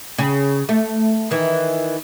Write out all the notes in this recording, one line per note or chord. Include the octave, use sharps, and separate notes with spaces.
C#3
A3
D#3 E3